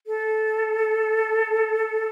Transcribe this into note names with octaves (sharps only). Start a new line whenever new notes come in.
A4